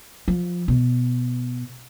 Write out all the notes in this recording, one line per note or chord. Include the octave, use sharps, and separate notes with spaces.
F3
B2